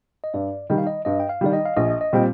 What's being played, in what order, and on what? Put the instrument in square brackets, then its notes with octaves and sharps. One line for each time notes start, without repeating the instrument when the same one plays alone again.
[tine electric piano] D#5
[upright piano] G2 [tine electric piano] D5
[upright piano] D#3 G3 [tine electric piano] D#5
[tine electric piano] F5
D#5
[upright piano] G2 [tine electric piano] D#5
[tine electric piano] G5
F5
[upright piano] D#3 G3 [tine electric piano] D5
[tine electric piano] D#5
F5
[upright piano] A#1 [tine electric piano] D#5
[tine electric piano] D#5
[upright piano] A#2 G3 C4 [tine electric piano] G5